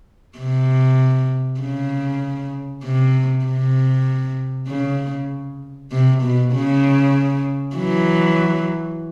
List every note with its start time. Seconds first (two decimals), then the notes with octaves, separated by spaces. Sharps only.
0.38 C3
1.60 C#3
2.84 C3
3.45 C3
4.68 C#3
5.92 C3
6.22 B2
6.53 C#3
7.76 E3 F#3